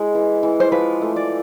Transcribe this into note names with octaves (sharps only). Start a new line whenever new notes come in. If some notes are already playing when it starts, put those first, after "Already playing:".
Already playing: G#3 E4
E3
E3
C5
F3 B4
A3
D5